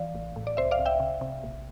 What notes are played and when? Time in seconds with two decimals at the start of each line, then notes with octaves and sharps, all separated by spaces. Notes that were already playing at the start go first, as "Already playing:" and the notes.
Already playing: E3 D5 F5
0.15 A1
0.36 A2
0.47 D5
0.57 C2 C5 E5
0.71 D5 F5
0.79 C2
0.86 E5 G5
1.00 C3
1.21 C3
1.43 A#1